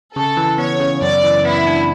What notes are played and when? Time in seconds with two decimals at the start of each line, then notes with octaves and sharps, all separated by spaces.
0.16 C#3 A4
0.37 E3
0.58 B3 C#5
0.80 C#3
1.01 F#2 D5
1.24 E3
1.44 B3 E4
1.67 D4